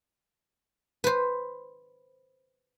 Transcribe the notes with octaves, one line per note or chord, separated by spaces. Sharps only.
B4 C5